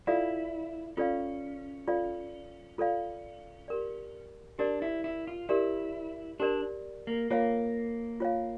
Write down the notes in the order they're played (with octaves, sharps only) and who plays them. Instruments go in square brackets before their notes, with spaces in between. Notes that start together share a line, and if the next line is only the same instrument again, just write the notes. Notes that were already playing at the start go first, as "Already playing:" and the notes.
[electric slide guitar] E4 [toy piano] F4 A4 D5 F5
[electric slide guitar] C#4 [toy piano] F4 A4 D5 F5
[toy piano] F4 A4 D5 F5
F4 A4 D5 F5
G4 A#4 D5
[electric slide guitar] D4 [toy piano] G4 A#4 D5
[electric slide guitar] E4
E4
F4
[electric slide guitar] E4 [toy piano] G4 A#4 D5
[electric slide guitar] D4 [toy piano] G4 A#4 D5
[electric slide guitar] A#3
[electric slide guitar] A#3 [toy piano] F4 C#5 F5
[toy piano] F4 C#5 F5